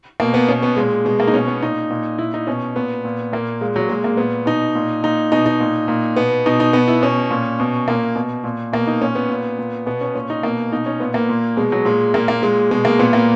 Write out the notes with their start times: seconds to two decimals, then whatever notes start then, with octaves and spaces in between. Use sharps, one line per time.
0.20 B2 A#3
0.34 B3
0.48 B2 C#4
0.63 B3
0.76 A#2 G#3
1.05 B2 G#3
1.20 A#3
1.27 D#4
1.34 B2 C#4
1.47 B3
1.62 A#2 D#4
1.91 A#2
2.18 A#2 E4
2.34 D#4
2.47 B2 C#4
2.75 A#2 B3
3.05 A#2
3.32 A#2 A#3
3.61 A#2 G#3
3.76 F#3
3.89 A#2 G#3
4.04 A#3
4.17 A#2 B3
4.46 B2 D#4
4.75 A#2
5.03 A#2 D#4
5.32 B2 D#4
5.46 D#4
5.60 A#2
5.88 A#2
6.16 B2 B3
6.46 B2 D#4
6.60 D#4
6.73 B2 B3
6.88 E4
7.03 B2 C#4
7.31 A#2
7.60 B2
7.88 A#2 A#3
8.16 B2
8.44 A#2
8.73 B2 A#3
8.87 D#4
9.01 A#2 C#4
9.15 B3
9.30 A#2
9.59 A#2
9.86 B2 B3
10.01 C#4
10.15 A#2 C#4
10.30 D#4
10.43 B2 A#3
10.72 B2 D#4
10.86 C#4
11.00 A#2 B3
11.14 A#3
11.29 A#2
11.57 B2 G#3
11.72 F#3
11.85 A#2 G#3
12.14 A#2 A#3
12.28 A#3
12.42 A#2 G#3
12.71 B2 G#3
12.85 A#3
12.99 A#2 B3
13.13 A#3